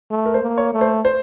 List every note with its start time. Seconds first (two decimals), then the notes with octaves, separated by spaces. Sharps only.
0.11 A3
0.26 A#4
0.34 C5
0.42 A#3
0.58 C#5
0.73 A3
0.81 C5
1.05 C5